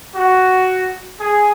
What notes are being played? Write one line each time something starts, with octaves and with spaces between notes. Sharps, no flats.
F#4
G#4